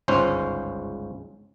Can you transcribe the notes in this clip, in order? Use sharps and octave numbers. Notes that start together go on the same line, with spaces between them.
G1 C#2 G#2 C#4 C5